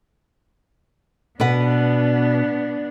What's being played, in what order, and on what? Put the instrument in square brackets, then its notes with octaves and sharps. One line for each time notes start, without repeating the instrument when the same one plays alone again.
[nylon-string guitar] B2 B4 F#5 [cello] B3 D4